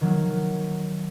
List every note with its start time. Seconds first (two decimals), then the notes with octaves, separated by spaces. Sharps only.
0.01 D#3 F#3 A#3